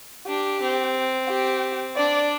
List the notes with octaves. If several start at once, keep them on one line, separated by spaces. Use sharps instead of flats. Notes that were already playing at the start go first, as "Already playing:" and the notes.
D4 G4
C4
G4
D4 D5